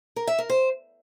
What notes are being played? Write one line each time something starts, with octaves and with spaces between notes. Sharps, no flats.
A#4
E5
A#4
C5